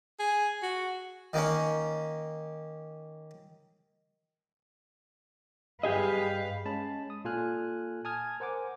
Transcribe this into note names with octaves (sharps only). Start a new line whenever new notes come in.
G#4
F#4
D#3 A#3 C#4
G2 G4 G#4 B4 D#5 F5
G#3 C#4 A5 B5
D#6
A#2 F4 A4 G#5 F6 F#6
G#5 A5 D#6 F6 G#6
A#4 C5 F#5 G#5 D6